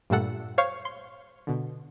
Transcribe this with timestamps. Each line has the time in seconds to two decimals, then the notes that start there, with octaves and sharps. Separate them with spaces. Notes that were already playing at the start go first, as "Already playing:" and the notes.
0.10 G2 A#2 G3 A3 A4 F#5
0.58 C5 C#5 F5 C#6
0.85 C6
1.47 B2 D3